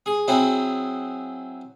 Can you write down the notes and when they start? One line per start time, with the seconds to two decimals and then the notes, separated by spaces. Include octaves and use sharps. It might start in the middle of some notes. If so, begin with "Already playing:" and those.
0.06 G#4
0.28 F#3 C4 E4 G#4